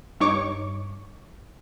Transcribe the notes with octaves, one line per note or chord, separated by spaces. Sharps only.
G2 D#4 C#5 C#6 D6